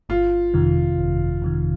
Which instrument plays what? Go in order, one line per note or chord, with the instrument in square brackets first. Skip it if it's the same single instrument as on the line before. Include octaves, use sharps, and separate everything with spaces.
[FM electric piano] G1 [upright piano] F4
[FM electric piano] F2 C3 D#3
G1
F2 C3 D#3